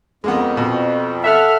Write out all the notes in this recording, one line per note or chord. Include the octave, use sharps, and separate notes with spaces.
F2 G#3 A#3 B3
B2
A4 E5 F#5 F6